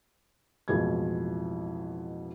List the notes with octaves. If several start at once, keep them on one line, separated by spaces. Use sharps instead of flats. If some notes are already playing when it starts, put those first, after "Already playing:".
A1 F2 B2 F3 G#3 G#6